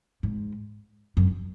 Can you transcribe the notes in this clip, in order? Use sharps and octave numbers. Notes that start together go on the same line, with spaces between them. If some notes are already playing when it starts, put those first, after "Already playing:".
G#2
F#2